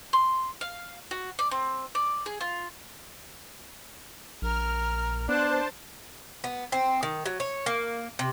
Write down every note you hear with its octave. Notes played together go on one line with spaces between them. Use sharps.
C6
F5
F#4
D5
C4
D5
G#4
F4
A#1 A#4 F6
B3 D4 C5 A5 F#6
B3
C4
D#3
F#3
C#5
A#3
C3